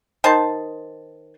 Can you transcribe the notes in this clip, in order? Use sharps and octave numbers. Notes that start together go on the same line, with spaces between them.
D#3 C5 A5